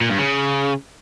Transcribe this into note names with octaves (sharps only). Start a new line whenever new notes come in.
A#2
G2
C#3